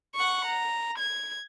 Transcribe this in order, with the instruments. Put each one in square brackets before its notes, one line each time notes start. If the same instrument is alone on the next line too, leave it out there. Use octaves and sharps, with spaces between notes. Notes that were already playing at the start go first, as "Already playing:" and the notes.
[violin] F#5 C#6
A#5
G#6